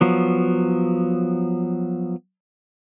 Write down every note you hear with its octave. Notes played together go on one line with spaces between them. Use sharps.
F3 F#3 B3